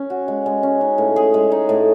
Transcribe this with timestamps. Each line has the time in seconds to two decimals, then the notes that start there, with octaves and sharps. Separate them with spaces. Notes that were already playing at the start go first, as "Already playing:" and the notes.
Already playing: C#4
0.10 F#4
0.28 G#3
0.46 G#3
0.63 C#4
0.81 D#4
0.98 A2
1.16 G#4
1.34 G#3
1.52 D#4
1.69 A2